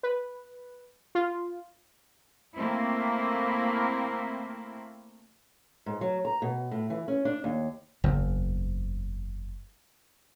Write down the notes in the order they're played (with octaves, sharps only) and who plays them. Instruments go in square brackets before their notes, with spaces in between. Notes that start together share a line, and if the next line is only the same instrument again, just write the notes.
[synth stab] B4
F4
[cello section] A3 A#3 C4 E4
[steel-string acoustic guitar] G#2
F#3
A#5
B2
A2
E3
C#4
D4
D#2
[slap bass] F#1 E2